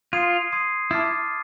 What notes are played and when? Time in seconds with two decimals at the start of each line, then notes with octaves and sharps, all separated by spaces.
0.13 F4 C6 D#6 G#6 C7 D#7
0.52 C6 D#6 G#6 C7 D#7
0.91 E4 A5 D6 F6 A6 C7